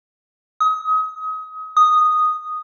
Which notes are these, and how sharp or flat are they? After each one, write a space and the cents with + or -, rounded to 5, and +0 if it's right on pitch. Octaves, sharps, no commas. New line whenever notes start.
D#6 +30
D#6 -5